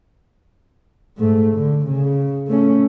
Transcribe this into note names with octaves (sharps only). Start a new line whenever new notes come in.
G#2 A3
D3
C#3
A3 C#4